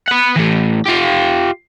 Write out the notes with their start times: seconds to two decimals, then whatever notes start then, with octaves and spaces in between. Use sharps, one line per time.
0.08 B4 F#5
0.36 E3 A3
0.86 F4 G4